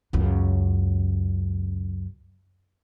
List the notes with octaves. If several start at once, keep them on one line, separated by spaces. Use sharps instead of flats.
C#2 F#2